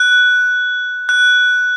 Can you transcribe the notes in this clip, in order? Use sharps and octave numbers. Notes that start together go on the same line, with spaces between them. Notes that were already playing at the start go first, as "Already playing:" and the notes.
Already playing: F#6
F#6